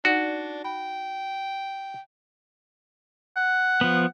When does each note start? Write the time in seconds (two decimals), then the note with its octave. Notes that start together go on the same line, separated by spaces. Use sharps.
0.05 D4 D#4 F#4 D5 F#5
0.64 G5 B5
3.37 F#5
3.81 F3 B3